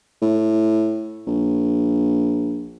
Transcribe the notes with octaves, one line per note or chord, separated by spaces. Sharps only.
A2
A#1